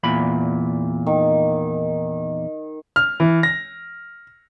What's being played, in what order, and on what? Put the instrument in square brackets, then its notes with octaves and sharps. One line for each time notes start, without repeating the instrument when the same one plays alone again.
[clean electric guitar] E2 A#2 B5
[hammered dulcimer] D#3
[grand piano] F6
E3
A#6